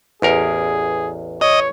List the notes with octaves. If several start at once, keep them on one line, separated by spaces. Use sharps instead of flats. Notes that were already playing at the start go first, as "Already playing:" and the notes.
A1 E2 G#4 A#4
C#5 D#5